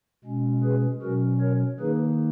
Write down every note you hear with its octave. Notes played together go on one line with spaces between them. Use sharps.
B2 G#3 C#4
G#4 B4
B2 F#3 C#4 F#4 A#4
A#4 C#5
D#3 A#3 D#4 G#4 B4